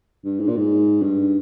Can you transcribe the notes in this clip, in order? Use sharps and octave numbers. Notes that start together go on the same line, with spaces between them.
G2
G#2
A#2
G#2
G2